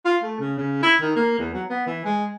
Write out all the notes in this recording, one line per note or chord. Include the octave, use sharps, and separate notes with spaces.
F4
A3
C#3
C#3
E4
D#3
A#3
E2
F#3
B3
E3
G#3